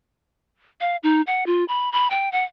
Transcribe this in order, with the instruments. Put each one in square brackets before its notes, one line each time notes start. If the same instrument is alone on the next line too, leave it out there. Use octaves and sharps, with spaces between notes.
[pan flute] F5
D#4
F#5
F4
B5
B5
G5
F#5